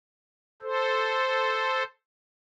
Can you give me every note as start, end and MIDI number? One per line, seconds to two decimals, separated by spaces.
0.62 1.83 69
0.62 1.83 72